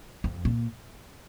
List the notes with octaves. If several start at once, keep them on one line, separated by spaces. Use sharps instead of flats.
F2
A#2